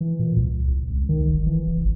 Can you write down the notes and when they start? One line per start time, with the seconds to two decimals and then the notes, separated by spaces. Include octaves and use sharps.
0.01 E3
0.19 A#2
0.36 C2
0.68 C2
0.90 C#2
1.09 D#3
1.29 G1
1.46 E3
1.67 F1
1.81 G#1